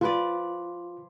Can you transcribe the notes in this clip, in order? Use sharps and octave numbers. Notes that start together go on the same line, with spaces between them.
F3 F4 B4 D5